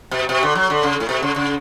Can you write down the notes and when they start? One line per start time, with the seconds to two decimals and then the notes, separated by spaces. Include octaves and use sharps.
0.11 B2
0.29 B2
0.43 D3
0.55 F#3
0.70 D3
0.83 C#3
1.00 A2
1.09 B2
1.22 C#3
1.36 C#3